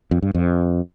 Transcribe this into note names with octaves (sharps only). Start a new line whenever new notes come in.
F2
G2
F2